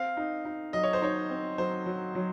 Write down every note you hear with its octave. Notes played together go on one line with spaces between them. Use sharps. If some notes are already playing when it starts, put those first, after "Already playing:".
Already playing: C4 F5
D#4
D#4
F#3 D#5
C#5
C5
D#4 C#5
C4
F#3 C5
F#3
F#3